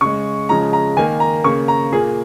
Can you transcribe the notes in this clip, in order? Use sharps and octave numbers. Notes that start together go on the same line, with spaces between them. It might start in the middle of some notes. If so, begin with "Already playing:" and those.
C#3 G#3 C#6
C#3 F3 G#3 A#5
A#5
D#3 A#3 G#5
A#5
C#3 A#3 C#6
A#5
A#2 A#3 G#4